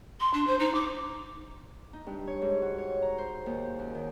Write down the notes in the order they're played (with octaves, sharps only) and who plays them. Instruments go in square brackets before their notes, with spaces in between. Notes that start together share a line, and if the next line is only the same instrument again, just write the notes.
[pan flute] C6
D4
C5
D#4
D6
[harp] D#4
G2
C#5
G#2
F#4
C#5
A#5
C5
D#2
F#2
D#3